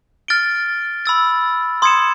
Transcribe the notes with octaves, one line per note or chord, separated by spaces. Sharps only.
F6 A6 D7 G7
B5 E6 A6
C6 D#6 G#6 C#7 E7